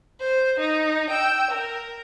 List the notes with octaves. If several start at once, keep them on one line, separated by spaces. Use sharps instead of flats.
C5
D#4
G5 E6
A#4